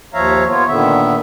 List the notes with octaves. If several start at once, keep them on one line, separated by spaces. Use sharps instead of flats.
D#2 F3 C#5 E5 F5 A#5
B3 F4 C#5
A#2 D3 D#3 B3 E5